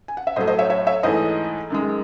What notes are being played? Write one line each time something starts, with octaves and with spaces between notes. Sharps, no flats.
G#5
F#5
E5
A2 F#3 A3 C5 D#5
C5 D#5
C#5 E5
C#5 E5
C#5 E5
G#2 E3 A3 C5 D#5
F#2 D#3 G#3